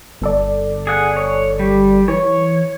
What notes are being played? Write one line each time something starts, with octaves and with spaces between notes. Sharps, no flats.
G1 A4 D5
G#4 F#5
C#5
G3
E3 C#5